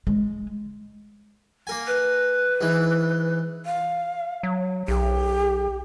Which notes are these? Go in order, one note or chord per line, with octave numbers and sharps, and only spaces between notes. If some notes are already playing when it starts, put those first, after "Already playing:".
G#3
A#3 A#4 G#5
B4
G#2 E3
F5
F#3
B1 G4